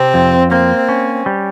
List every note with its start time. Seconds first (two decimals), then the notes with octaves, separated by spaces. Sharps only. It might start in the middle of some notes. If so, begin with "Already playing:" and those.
Already playing: C3 C4
0.14 F2
0.51 A#3 C4
0.89 C#4
1.26 G3